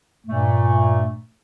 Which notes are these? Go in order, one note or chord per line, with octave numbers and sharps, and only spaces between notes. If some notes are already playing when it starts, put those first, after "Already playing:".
G2 A#2 A3